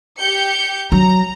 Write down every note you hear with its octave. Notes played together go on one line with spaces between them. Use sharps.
G4 G6 C#7
F#3 A#5